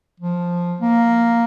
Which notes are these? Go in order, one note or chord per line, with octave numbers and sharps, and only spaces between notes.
F3
A#3